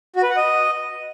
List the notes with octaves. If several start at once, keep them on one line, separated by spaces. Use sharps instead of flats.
F#4
B4
F#5
D#5